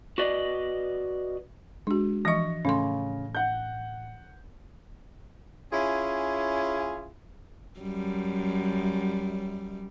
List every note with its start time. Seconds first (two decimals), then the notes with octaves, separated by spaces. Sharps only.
0.18 F#4 B4 D5 D#5
1.87 G#3 D4 F#4
2.25 E3 F3 D#5 C#6 A#6
2.65 A2 C#3 C#4 A4 C6
3.35 F#5 G6
5.72 C#4 E4 F4 G#4
7.79 F#2 G3